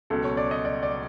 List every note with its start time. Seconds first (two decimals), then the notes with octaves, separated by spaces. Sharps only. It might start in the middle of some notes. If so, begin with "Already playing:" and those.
0.10 C#2 B2 F#3 A4
0.24 C#5
0.37 D5
0.51 D#5
0.65 D5
0.83 D5